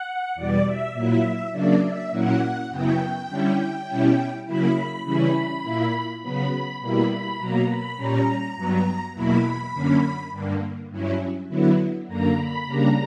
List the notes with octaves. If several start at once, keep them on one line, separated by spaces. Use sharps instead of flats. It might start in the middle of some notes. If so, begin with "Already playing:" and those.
Already playing: F#5
E2 B2 G3 D5
E5
A#2 F#3 A#3 E4 E5
C#3 F#3 A#3 D4 D5
E5
A#2 F#3 A#3 C#4 E4 F#5
F#2 C#3 F#3 B3 E4 G5
D3 G3 C#4 E4
B2 G3 C#4 E4
C#3 F#3 A#3 E4 B5
C#3 E3 G3 C#4 E4
A#2 A#3 E4
C#3 F#3 B3 B5
B2 G3 A#3 E4 B5
B5
B2 F#3 A#3 A#5
B5
A#2 G3 C#4 A#5
G2 F#3 B3
E2 B2 F#3 A#3 E4 B5
F#2 D3 A#3 C#4
G2 D3 A#3
G2 F#3 C#4 E4
D3 F#3 B3 E4
F#2 D3 A#3 A#5
B5
C#3 G3 A#3 D4 A#5